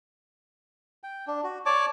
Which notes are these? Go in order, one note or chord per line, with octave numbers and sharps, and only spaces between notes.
G5
D4
F#4
C#5 D5 A5 D6